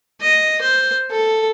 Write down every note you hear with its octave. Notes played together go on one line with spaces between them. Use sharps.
D#5
C5
A4